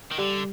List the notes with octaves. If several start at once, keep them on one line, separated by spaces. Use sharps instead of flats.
D#3
D3 G3